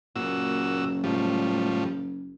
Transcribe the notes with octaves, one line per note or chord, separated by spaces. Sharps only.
F#1 A#2 F#4 E6
A2 F3 G3